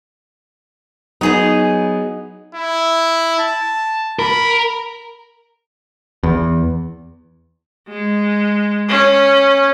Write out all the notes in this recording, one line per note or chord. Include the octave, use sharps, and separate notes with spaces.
F#3 B3 D#4 G#4 D#5
E4
A5
A#4 B5
E2
G#3
C#4